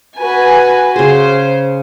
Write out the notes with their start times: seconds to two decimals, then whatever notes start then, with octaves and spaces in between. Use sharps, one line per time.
0.18 F#4 B4 G#5
0.96 C#3 G#4 C5